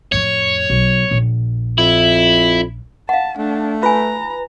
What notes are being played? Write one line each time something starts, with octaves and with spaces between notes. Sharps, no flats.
F2 A2 C#5
B1
A#1
F2 E4
F5 F#5 A5
A3 D4
F4 B4 G#5 A#5